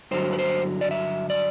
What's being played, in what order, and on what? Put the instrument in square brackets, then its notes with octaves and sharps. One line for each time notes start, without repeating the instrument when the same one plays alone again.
[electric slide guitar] G2 D3 F#3 C5
B4
C5
D5
E5
D5